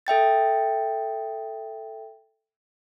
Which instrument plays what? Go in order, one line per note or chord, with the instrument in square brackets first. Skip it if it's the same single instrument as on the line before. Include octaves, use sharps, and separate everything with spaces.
[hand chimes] A4 E5 G5 A6